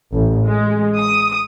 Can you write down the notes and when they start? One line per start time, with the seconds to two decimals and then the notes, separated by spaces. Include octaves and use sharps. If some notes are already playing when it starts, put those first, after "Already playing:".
0.12 A1
0.47 G#3
0.98 D#6